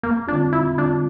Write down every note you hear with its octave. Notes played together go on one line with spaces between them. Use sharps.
E2 A#3
D3 G3 C4 D4 F4
E2 E4
D3 G3 C4 D4 F4